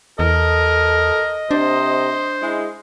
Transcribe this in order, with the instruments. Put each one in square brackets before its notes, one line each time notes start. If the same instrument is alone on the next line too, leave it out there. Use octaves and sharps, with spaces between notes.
[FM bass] E2 [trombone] A4 [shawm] A#4 [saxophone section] D#5
[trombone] C3 [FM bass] D4 [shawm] C5
[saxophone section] G#3 [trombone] E4